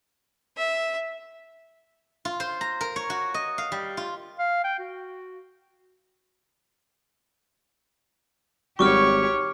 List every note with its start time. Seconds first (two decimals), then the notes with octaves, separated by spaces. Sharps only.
0.56 E5
2.25 F4
2.40 C5
2.61 A#5
2.81 A#4
2.96 C#5
3.10 F#4
3.34 D#5
3.58 F5
3.72 G3
3.97 F4
4.39 F5
4.64 G5
4.79 F#4
8.79 G#1 G3 F#4 G4 C#5 C#6 D6 F6